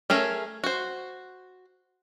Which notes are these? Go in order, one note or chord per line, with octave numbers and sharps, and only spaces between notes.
A3 C#4 G#4 A#4
F#4 C5